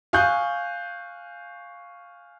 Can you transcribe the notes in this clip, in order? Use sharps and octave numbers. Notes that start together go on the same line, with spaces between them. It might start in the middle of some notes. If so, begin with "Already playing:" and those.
F5 G#5 C#6 D#6 F#6 G6